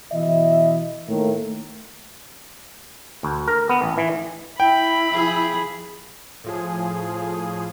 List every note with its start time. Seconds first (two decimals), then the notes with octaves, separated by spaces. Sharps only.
0.12 B2 E3 E4 D#5 E5
1.08 A2 D#3 A3 A#3
3.23 D2
3.48 A#4
3.69 B3
3.82 A1
3.98 E3
4.60 E4 G5 B5
5.10 F3 G#4
6.44 A2 F3 G#4